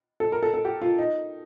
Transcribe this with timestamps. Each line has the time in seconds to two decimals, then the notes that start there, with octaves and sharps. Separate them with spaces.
0.20 A4
0.32 A#4
0.43 A4
0.54 A4
0.65 G4
0.82 F4
0.99 D#4